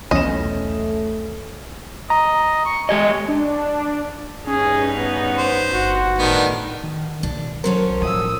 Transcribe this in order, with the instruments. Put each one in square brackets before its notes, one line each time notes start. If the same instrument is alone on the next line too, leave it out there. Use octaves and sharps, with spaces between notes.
[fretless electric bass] B1 E2 E3 [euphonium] A3 [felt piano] C#4 E7 [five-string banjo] D#5
[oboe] D#5 [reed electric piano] A#5
[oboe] C#6
[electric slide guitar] G#3 G4 D#5 [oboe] C#5
[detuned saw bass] D4
[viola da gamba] G2 D#4 B4 [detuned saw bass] C#4 [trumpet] G#4
[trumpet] B3
[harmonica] C5
[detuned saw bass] G1 [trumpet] F#4
[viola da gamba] A2 [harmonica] D#3 B3 D4
[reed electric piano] D#3
[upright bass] B1 [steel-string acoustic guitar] D4
[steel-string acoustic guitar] F#3 C#4 A4 [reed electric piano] A#4 [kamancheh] C5 C#5
[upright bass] A2 F3 [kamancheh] D#6 E6